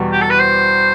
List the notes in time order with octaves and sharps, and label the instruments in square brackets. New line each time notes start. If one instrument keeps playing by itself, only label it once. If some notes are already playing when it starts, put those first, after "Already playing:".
Already playing: [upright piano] E2 B2 G3
[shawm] G4
A4
B4
C5